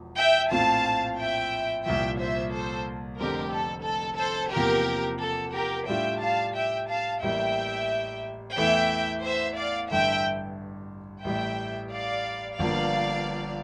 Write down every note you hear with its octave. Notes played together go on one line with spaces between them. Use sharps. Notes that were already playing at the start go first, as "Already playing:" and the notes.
Already playing: E1 E2 F3
E5 G5
A#1 A2 F3 C4 F5 A5
E5 G5
C2 A#2 F3 E5 G5
C5 E5
A4 C5
F1 F2 D3 A3 C4 G4 A#4
A4
A4
A4 C5
E2 C3 F3 A#3 G4 A#4
A4
G4 A#4
A2 G3 D4 F4 E5 G5
F5 A5
E5 G5
F5 A5
A1 A2 G3 A#3 E5 G5
E2 E3 A3 E4 E5 G5
C5 E5
D5 F5
A1 G2 D3 E5 G5
A1 A2 G3 E5 G5
D5 F5
G1 G2 F3 A#3 D5 F5